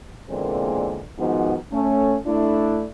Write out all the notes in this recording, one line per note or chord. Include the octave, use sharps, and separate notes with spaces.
E2 A#2 D3 G#3 A#3 C4
G#2 D#3 F3 B3 D#4 F#4
A3 C#4
A3 D4 E4